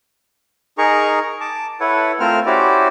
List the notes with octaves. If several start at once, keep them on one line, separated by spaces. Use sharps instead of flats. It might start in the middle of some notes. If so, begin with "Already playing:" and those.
D#4 G#4 A#4 A#5 C#6
A5 D6
E4 A4 B4 C#5 F#5
A3 C4 F4 A#4 C5 F6
C#4 E4 F#4 G4 C5 D5